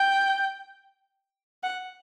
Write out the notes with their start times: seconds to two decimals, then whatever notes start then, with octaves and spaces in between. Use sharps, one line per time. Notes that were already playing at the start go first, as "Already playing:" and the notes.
Already playing: G5
1.64 F#5